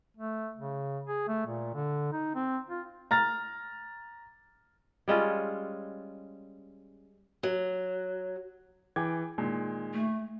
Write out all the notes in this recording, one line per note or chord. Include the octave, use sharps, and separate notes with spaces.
A3
C#3
G#4
A3
A#2
D3
D#4
C4
F4
A#5 F6 A6
G3 G#3 C#4 F4
F#3
E3 G#4 G5 D6 G#6
A#2 D#3 G#3
A3